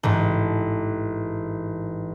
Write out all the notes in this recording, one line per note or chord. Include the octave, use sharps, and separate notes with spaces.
A1 G#2